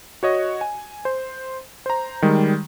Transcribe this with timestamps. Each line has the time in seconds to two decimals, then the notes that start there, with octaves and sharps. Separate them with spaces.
0.23 F#4 C#5 D#5
0.61 G#5
1.05 C5
1.86 C5 A#5
2.22 D#3 G3 G#3